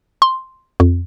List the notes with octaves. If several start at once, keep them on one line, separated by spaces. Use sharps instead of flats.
C6
F2